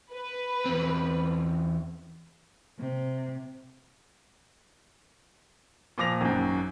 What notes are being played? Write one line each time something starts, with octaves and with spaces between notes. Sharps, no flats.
B4
E2 C4
C3
A#2 F3 D6 A#6 F7
G#1 F#2